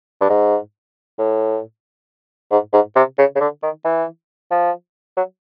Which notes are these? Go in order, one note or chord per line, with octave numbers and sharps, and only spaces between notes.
G2
G#2
A2
G#2
G#2
C3
C#3
C#3
D3
D#3
E3
F3
F#3